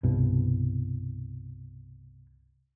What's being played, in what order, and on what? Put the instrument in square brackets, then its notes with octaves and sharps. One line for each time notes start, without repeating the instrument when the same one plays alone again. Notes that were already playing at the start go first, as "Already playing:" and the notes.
[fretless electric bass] C2 G2 B2